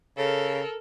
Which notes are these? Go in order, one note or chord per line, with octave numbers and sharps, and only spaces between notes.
C#3 A4 A#4